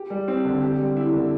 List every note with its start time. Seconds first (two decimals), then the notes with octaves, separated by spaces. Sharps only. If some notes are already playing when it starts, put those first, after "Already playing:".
Already playing: G4
0.10 G3
0.28 C4
0.45 D3
0.61 G4
0.79 G3
0.97 E4
1.13 D3